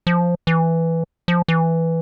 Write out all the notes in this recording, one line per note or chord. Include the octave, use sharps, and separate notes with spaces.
F3
E3
F3
E3